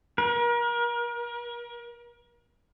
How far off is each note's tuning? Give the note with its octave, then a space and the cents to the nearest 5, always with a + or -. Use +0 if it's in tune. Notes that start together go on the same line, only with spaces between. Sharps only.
A#4 +35